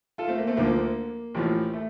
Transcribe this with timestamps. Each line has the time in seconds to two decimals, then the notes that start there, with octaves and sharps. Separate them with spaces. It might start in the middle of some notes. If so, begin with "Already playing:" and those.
0.18 F4 A4
0.28 A3 C4
0.38 A#3
0.47 A3 C4
0.57 D2 D3 F3 A#3
1.35 A1 A2 F3
1.73 A3